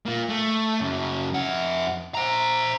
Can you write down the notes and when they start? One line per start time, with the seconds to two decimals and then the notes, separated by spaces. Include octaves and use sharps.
0.06 A#3 F4
0.29 A3
0.81 F#2 C#3
1.34 F2 F#5
2.15 C5 A#5